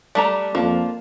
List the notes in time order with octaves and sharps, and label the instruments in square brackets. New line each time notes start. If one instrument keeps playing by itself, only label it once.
[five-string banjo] G3 A3 A#5 [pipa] D4
[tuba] F2 [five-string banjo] F3 [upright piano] A#3